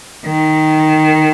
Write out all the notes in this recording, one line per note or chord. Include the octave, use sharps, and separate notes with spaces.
D#3